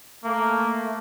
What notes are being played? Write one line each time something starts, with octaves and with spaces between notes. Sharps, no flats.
A3 A#3